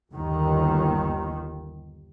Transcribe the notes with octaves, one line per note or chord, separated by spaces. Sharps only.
G1 D#2 D#3